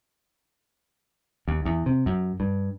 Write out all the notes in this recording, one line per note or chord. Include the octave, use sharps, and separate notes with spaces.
D#2
E2
C3
F#2
G2